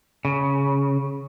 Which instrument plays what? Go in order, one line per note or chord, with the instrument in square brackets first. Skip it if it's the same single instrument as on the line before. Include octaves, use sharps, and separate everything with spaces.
[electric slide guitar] C#3